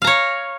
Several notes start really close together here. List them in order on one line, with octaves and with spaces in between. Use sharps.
F5 A#5 C#5